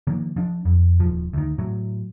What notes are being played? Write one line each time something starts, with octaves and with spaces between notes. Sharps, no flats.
D#3 F3 A#3
F3 D4
F2
D#1 F3
D2 D#3
A2 F#3